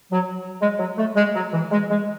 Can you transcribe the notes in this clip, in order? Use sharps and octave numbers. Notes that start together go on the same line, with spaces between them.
F#3
G#3
F#3
A3
G#3
F#3
E3
G#3
G#3